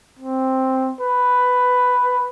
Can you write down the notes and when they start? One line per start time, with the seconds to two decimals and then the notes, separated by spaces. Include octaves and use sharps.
0.19 C4
1.00 B4